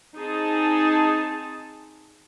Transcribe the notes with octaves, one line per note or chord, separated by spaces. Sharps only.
C4 D#4 G#4 A5